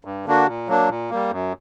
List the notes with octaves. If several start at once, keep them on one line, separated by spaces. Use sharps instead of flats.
G2
D3 A#3 D4 F#4
A#2
F#3 A#3 D4
A#2
G3 A#3
F#2